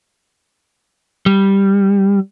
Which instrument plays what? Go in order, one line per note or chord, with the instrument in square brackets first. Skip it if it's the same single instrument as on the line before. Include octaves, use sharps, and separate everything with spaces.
[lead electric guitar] G3